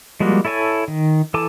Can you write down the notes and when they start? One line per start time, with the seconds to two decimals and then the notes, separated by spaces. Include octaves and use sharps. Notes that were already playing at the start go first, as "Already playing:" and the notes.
0.20 F3 G3 G#3 A#3 F#4
0.45 E4 A4 C#5 G#5 A5
0.88 D#3
1.34 E3 A4 G#5 A5 D6